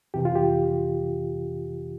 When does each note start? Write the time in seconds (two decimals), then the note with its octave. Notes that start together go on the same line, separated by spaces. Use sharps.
0.14 F2 C3 E3 G4
0.25 F4
0.35 G4